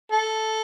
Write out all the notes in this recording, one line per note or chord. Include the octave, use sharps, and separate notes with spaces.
A4